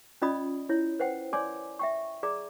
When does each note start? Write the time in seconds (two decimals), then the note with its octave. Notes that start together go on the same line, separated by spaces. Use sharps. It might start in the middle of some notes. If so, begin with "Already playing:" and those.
0.22 C#4 F4 D5 D#5 B5 D#6
0.69 E4 C#5
1.00 B4 C5 F#5 G5
1.33 C#5 D5 G#5 C6 D6
1.79 E5 G5 C#6
2.23 G#4 D5 A#5 D6